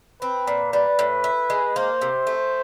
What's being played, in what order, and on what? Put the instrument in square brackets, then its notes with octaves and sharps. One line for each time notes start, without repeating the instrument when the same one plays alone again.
[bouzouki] C4 [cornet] B4
[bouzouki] A#2
[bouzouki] G3 [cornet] B4
[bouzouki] A2
E4
G#3
[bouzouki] A#3 [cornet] C5
[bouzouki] C3
A3